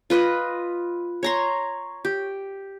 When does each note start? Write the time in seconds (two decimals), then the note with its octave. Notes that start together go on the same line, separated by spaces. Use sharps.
0.10 F4 B4 D#5 B5
1.23 C#5 A#5 C6
2.05 G4